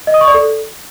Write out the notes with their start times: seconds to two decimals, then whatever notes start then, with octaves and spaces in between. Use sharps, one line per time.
0.07 D#5
0.14 D#6
0.21 C#6
0.27 D5
0.34 A4